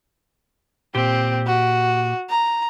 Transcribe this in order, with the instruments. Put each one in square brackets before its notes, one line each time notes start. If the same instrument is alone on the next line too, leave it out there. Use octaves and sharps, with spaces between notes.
[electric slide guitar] A#2 G4 [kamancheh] C4
[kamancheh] F#4
A#5